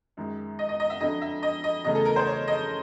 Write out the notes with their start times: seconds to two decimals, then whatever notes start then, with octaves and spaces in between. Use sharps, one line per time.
0.17 F#2 D#3 G#3
0.59 D#5
0.69 D#5
0.80 D#5
0.90 E5
1.00 F2 D3 F#3 D#5
1.21 E5
1.43 D#5
1.64 D#5
1.85 E2 C#3 F#3 A3 D#5
1.95 A4
2.05 A#4
2.16 C5
2.26 C#5
2.48 D#5